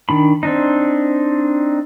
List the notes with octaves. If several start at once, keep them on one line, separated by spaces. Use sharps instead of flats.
D#3 D4 B5
C4 D4 D#4